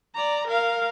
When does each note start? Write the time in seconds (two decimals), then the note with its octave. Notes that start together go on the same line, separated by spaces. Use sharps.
0.15 D5 A#5
0.47 A#4 F5